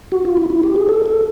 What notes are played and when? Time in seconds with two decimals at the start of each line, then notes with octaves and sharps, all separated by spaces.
0.12 F#4
0.25 F4
0.37 E4
0.50 E4
0.63 G4
0.76 G#4
0.89 A4
1.06 A4